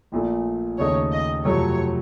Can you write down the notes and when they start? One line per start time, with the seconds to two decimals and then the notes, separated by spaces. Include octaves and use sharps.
0.12 A#1 A#2 A3
0.78 D#2 C#3 A3 D#4 C#5
1.12 D#5
1.45 F2 C3 F#3 A3 C#5